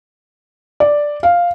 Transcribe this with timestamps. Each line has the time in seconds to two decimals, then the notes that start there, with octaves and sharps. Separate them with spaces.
0.80 D5
1.23 F5